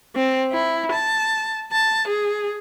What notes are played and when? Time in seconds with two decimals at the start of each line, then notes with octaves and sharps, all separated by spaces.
0.16 C4
0.52 E4
0.92 A5
1.73 A5
2.08 G#4